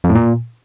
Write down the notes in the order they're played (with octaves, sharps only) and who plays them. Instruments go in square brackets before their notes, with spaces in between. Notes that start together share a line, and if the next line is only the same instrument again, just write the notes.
[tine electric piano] F2
A2
A#2